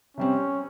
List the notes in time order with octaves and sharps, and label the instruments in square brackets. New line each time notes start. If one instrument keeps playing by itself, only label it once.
[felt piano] C3 G3 C4 [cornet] C#4